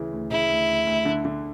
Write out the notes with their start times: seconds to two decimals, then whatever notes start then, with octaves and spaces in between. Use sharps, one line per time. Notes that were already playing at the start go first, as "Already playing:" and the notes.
Already playing: D2 C#3 E3
0.13 D2
0.30 C#3 E4
0.49 D2
0.68 D2
0.86 D2
1.05 D3
1.25 D3